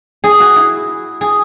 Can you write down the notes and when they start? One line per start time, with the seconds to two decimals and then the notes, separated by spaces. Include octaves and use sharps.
0.24 G#4
0.40 F#4
0.56 E4
1.21 G#4